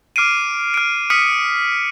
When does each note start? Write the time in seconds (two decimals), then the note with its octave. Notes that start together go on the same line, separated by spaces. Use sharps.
0.16 D6 F6 C7 D7 D#7
0.74 F6 D7
1.10 D#6 F6 B6 C#7 D#7